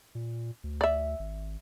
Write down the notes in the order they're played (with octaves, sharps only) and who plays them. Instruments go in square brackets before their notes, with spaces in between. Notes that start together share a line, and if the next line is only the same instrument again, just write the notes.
[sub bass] A#2
D2
[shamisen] D5 E5
[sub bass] G#1